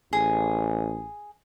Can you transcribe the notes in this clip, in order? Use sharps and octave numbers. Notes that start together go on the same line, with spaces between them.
A1 G#4